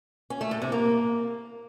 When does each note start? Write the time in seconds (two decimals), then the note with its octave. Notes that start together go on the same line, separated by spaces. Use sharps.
0.30 C#4
0.41 A3
0.51 A2
0.62 C3
0.72 A#3